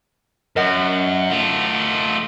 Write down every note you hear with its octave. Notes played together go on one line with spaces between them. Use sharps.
F#2 A#4 D#5 F#5
A3 F4